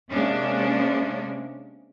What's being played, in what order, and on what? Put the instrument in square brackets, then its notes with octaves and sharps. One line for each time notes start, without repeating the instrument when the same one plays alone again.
[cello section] C3 G#3 A#3 C#4 D4